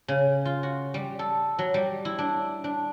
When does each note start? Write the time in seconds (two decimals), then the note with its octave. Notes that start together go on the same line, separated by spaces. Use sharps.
0.08 C#3
0.45 F4
0.63 F#4
0.94 G3
1.19 A4
1.59 F#3
1.74 G3
2.05 E4
2.19 D4
2.64 D4